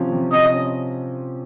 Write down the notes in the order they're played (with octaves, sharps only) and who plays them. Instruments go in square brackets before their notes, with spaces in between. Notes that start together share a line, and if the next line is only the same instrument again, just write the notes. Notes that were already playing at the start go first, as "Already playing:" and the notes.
Already playing: [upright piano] C3 F3 C#4
C3
[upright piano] C3 [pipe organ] D#5
[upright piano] C#4